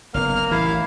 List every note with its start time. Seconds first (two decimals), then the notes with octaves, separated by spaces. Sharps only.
0.14 F#1 A#3 B3 F6
0.51 A1 E3 E4 F5